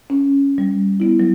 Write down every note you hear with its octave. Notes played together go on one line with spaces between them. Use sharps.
C#4
G3
B3 E4
F#3